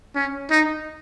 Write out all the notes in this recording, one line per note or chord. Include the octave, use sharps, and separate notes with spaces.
C#4
D#4